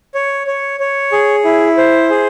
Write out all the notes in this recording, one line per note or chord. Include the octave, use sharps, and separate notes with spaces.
C#5
C#5
C#5
G#4
E4
C5
G#4